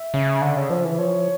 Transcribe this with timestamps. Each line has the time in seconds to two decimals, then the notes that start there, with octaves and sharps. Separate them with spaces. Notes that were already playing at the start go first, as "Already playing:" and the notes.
Already playing: E5
0.14 C#3
0.41 D3
0.57 C#3
0.70 F3
0.85 E3
0.98 F3 C#5